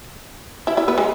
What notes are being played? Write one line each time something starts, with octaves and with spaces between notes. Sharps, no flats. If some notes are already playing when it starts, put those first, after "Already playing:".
E4 E5
E4 E5
B3 B4
G#3 G#4